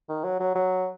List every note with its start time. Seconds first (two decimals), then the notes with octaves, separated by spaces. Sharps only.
0.09 D#3
0.24 F#3
0.40 F#3
0.55 F#3